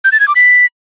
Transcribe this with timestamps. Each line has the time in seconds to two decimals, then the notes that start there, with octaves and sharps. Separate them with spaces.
0.05 G6
0.12 A6
0.20 G#6
0.28 D6
0.36 B6